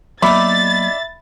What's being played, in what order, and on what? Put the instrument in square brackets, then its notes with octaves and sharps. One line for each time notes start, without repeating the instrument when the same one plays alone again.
[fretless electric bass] F#3 A#3 B3 [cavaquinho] D#4 D5 [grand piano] E5 B5 [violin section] A6